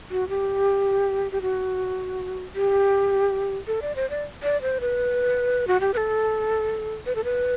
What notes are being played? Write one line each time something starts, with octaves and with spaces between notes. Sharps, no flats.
F#4
G4
G4
F#4
G4
A4
D5
C5
D5
D5
C5
B4
F#4
G4
B4
A4
B4
A4
B4